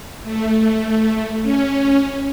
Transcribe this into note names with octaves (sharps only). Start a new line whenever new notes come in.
A3
C#4